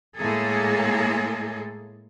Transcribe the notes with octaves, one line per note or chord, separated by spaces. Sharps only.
A2 G#3 A#3 G#4 A4